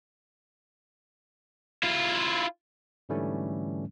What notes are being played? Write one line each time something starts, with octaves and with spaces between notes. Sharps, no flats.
E4 F4
G#2 D3 E3 G3 A3 C#4